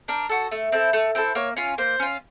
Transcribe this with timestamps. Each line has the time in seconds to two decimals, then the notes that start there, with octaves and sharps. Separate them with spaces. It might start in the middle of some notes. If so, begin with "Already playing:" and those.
0.08 D4 A#4
0.29 F#4 A4
0.51 A3
0.72 C4 E4 A4
0.93 A3
1.15 C4 E4 A4
1.35 A#3 C#5
1.57 C#4 F4
1.78 A#3 C5
1.99 C#4 F4